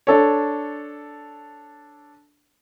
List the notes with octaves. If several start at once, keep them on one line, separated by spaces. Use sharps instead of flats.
D4 A4 C#5